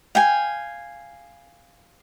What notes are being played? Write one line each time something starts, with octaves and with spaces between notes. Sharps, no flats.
F5 G5 G#5